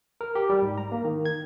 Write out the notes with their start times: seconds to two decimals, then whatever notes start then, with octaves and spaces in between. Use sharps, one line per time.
0.21 A#4
0.35 G4
0.50 G3
0.62 G#2
0.78 A#5
0.92 A#3
1.05 D#3
1.26 G#6